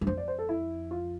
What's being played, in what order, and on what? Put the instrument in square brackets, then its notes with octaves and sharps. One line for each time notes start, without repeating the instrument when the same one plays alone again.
[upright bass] G2
[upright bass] F2 [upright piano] C5
[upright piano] D5
C5
A4
E4
F4